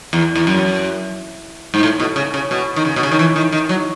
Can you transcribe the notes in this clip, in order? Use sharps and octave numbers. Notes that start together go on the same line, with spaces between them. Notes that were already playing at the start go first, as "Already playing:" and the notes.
E2
E2
F#2
G#2
A2
B2
C#3
C#3
B2
D#3
C#3
B2
C#3
D#3
E3
D#3
D#3
F#3